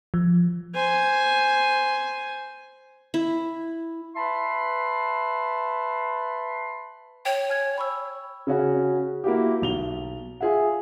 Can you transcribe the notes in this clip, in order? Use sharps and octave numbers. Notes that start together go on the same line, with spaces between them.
F3
C5 G#5
E4
B4 E5 A5 B5 C6
C#5 G5
G#5 F6 G#6
B5 C#6 E6
C#3 C#4 F#4
A#3 E4 F#4 G4
B1 F7 G7
F4 G#4 E5 F#5